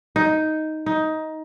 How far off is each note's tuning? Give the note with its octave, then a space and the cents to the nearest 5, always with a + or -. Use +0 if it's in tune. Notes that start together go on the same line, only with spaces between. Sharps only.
D#4 +5
D#4 +15